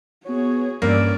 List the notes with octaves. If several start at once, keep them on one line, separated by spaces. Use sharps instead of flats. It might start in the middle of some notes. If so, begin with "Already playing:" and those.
B3 F#4 G#4 C#5
G2 A#3 C#4 D5 E6